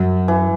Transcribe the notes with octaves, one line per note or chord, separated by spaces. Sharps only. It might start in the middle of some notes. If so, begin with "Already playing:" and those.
Already playing: F#2
E3